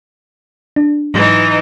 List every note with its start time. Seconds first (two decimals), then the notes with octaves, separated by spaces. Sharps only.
0.76 D4
1.14 G#2 E3 F#3 D#4 C6